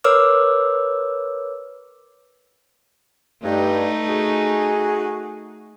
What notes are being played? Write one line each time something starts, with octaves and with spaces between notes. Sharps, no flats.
A#4 B4 C#5 D6 E6 F6
G2 A3 D#4
F#4 G#4